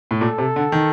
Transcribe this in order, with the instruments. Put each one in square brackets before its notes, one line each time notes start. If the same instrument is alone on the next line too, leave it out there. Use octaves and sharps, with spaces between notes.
[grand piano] A2
[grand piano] A#2 [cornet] A4
[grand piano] C3
D3
D#3